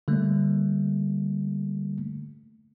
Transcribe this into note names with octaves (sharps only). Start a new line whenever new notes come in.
D3 G3 A3 A#3